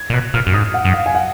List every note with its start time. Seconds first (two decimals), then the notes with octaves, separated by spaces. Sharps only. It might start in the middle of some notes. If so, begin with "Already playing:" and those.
Already playing: G#6
0.10 A#2
0.13 B2 F#6
0.34 A#2 F6
0.47 F#2
0.54 G#2 D#6
0.74 F#5
0.85 F#2
0.94 F5
1.06 G#5
1.15 F#5